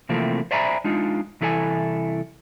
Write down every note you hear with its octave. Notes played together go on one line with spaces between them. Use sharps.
C3 E3 F3 A3 A#3 C4
C5 D5 E5 G#5 A#5 B5
G#3 D4 D#4 F4
C2 E3 E4 A4 D5 G#5